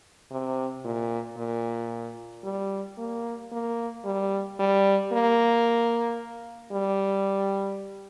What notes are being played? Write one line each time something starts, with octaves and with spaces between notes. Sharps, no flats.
C3
A#2
A#2
G3
A#3
A#3
G3
G3
A#3
G3